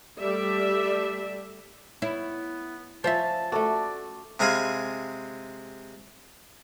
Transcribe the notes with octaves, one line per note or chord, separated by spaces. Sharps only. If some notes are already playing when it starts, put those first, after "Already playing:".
G3 A3 A4 D5 E5
B3 E4 C#5
F3 C#4 C5 E5 A5
A3 F#4 A4 D5
C3 G#3 G#4 F5 G#5 B5